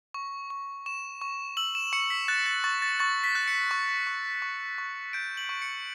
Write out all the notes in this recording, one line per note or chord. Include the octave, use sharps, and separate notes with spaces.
C#6
C#6
C#6 E7
C#6
E6 F#7
E7
C#6 C#7
B6
F#6 A6
A6
C#6 A6
A6
C#6 A6
B6
F#6
C#7
C#6
C#6
C#6
C#6
G6 D7
F#7
C#6
C#7